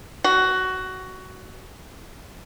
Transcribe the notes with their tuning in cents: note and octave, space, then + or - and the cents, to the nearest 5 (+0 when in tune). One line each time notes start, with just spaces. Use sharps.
F#4 +15